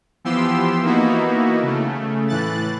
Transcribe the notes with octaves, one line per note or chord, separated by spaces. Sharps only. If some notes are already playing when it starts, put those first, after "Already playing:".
E3 F3 B3 G4 C6 E6
E3 A#3 B3 D#4 E4 F#4
C#3 A3
A2 E3 F#6 A6